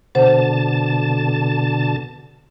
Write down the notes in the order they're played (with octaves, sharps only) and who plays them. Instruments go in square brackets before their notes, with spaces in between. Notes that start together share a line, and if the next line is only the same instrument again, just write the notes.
[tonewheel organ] B2 D3 A5 [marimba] C5 F#5